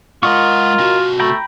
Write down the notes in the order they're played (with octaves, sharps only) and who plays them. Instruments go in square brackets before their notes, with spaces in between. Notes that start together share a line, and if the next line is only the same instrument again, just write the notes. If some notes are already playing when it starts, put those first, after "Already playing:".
[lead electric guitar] G#3 F#5 [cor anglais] F4 [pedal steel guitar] A#4 D#5 C#6
[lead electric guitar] C3 F#4
[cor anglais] A3 [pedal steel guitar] G5 A#5 B5